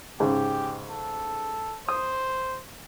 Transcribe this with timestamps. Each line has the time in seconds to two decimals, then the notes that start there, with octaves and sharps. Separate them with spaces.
0.20 G#2 C#3 G4
0.90 A4
1.89 C5 D#6